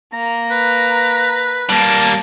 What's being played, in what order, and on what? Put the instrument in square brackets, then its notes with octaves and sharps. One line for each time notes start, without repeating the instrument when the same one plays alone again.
[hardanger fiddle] A#3 [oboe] A#5
[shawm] B4
[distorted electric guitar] G3 A#3 [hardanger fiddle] A5